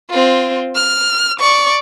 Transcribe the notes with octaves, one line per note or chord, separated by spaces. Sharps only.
C4 F4
F6
D5 C#6